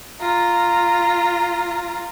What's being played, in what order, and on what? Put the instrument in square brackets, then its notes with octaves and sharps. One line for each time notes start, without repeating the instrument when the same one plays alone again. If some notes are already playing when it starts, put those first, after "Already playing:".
[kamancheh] F4 A#5